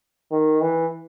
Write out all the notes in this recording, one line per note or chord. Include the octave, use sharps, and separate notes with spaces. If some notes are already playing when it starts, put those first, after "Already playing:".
D#3
E3